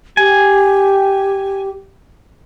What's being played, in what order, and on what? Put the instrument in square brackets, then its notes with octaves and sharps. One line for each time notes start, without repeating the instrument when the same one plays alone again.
[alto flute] G4 [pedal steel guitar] G#5